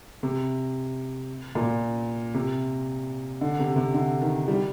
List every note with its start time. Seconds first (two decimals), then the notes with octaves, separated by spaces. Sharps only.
0.23 C3
1.55 A#2
2.34 C3
3.41 D3
3.59 C3
3.76 C3
3.94 D3
4.21 D#3
4.48 G3